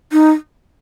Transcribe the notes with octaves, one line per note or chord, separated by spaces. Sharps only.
D#4